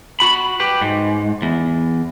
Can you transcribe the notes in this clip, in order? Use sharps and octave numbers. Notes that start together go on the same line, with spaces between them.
F#4 B5
G4 B4
G#2
E2